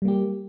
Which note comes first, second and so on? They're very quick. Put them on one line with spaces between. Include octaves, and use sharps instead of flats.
G3 A#3 G4